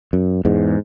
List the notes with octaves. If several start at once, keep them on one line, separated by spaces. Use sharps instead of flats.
F#2
E2 G#2